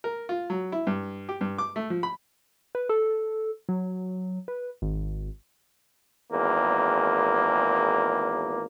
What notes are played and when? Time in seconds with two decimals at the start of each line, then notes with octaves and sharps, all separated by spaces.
0.04 A#4
0.29 F4
0.50 F#3
0.72 E4
0.87 G2
1.29 G4
1.41 G2
1.58 D6
1.76 A3
1.90 F3
2.03 B5
2.75 B4
2.89 A4
3.69 F#3
4.48 B4
4.82 G#1
6.30 G#1 E2 A#3